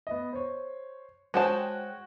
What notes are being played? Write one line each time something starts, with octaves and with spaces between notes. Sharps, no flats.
B3 D#5
C5 C#5
G#3 F#4 C5 C#5 G5 A5